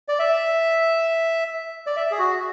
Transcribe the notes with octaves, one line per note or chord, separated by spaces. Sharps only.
D5
E5
D5
E5
G#4
F#4